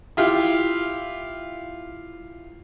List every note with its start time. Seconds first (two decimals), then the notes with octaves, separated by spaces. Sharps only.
0.17 E4 F4 G4 F5